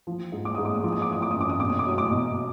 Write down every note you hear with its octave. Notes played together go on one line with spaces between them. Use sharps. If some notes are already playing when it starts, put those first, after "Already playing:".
F3
G#2
D6
G#2 D#6
D6
D#6
F3 D6
D#6
D6
F3 D#6
D6
F#2 D#6
D6
D#6
B2 D6
D#6
D6
F#3 D#6
D6
B2